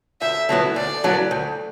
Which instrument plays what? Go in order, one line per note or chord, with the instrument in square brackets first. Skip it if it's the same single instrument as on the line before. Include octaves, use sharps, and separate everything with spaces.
[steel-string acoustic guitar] D2 [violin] E5
[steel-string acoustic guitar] D3 F#3 B3 E4
[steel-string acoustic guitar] D2 [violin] D5
[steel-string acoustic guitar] D3 F#3 B3 E4
D2